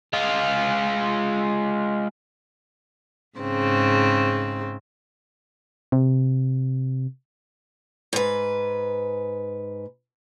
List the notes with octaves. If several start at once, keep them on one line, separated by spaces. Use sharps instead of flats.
G#3 F4
G#2 C#3 C4
C3
G#2 B4